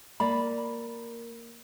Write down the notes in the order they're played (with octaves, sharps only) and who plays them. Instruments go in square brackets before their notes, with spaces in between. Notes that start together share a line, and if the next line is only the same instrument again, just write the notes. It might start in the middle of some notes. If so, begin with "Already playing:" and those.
[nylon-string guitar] A#3 [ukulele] D5 B5